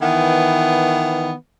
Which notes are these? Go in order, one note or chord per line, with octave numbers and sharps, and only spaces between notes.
D#3 E3 B3